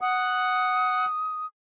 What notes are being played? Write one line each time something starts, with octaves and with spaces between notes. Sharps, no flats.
F#5 D#6